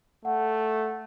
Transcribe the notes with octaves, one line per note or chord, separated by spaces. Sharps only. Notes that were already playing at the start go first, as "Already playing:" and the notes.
A3 F#5